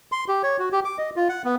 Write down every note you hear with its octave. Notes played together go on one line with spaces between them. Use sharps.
C6
G4
C#5
F#4
G4
D6
D#5
F4
F#5
B3